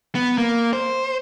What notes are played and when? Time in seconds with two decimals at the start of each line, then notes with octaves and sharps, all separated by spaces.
0.15 B3
0.38 A#3
0.73 C5